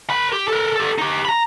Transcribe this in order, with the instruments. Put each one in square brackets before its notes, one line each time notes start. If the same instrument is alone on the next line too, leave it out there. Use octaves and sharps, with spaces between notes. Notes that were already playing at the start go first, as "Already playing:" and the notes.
[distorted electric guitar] A#4 B5
G4
A4 A#4
G4 A4
D#4 G4
A#5 B5